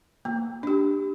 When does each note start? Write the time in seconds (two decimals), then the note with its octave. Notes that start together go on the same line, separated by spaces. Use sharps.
0.25 A#3
0.63 D4 G4